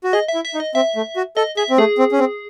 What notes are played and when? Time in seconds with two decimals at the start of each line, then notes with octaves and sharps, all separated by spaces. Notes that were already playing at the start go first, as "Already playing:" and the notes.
0.04 F#4
0.13 G#4 D#5
0.28 E5
0.34 E4
0.45 E5
0.54 D#4
0.60 D#5
0.75 C4 E5
0.96 A3
1.16 F#4
1.37 A4 D#5
1.57 G#4 E5
1.70 C4
1.78 A3 G#4
1.98 C4
2.12 C#4
2.19 C4